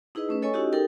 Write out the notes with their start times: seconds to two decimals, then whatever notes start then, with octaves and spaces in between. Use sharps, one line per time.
0.15 D#4 E4 G#4 B4 D#5
0.29 A3 C#4 B4
0.42 E4 A4 C#5 D#5 G#5 C#6
0.53 C#4 D#4 E4 F#4 G4 D#5
0.72 D#4 G4 A4 A#4 G5